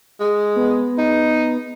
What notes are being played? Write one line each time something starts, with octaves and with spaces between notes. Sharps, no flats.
G#3
B3
D#4